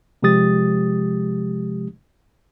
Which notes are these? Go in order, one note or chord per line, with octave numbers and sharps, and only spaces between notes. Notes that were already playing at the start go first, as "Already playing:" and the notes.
C3 F3 G#3 G4 D#6 A6